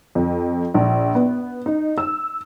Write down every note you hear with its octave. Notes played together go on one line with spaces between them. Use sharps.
F2
A#1
B3
D#4
E6